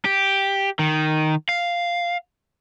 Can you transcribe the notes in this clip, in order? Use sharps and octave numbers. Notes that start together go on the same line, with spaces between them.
G4
D#3
F5